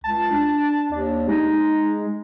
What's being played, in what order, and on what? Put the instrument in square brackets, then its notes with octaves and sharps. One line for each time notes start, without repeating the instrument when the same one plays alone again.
[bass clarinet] C#2 [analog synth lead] A5
[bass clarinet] D4
[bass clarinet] D#2 [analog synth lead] D4
[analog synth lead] G#3 [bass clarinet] D#4